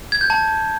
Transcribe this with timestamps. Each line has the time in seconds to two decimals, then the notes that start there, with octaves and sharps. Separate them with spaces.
0.12 G#6
0.21 G6
0.30 A5